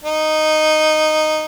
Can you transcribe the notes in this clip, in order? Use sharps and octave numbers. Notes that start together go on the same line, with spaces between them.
D#4